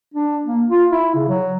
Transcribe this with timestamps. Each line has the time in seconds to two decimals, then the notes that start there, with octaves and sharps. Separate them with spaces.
0.14 D4
0.45 A#3
0.69 F4
0.91 E4
1.15 C#3
1.28 F#3